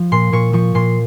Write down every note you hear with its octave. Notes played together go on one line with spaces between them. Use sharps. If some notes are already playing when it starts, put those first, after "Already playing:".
Already playing: F3
A#2 C6
A#2 C#6
F3 C#6
A#2 C6